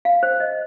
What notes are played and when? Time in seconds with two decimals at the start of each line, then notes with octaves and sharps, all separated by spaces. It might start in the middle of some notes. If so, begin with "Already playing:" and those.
0.05 F5
0.23 C5
0.40 D#5